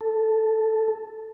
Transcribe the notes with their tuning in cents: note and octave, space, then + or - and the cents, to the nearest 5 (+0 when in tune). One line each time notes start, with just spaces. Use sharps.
A4 +0